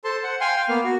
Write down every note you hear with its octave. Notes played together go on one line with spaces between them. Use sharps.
A4 C5 A5 C6
C5 F#5
F5 G5 G#5 C6
F5 G5
A#3 B3 F5
F#4